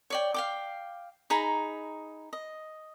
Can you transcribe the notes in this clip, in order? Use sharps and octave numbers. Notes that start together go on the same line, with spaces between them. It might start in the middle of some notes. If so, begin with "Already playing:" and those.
C#5 D5 G5
F5 G5 D6
D#4 G#4 A#5 B5
D#5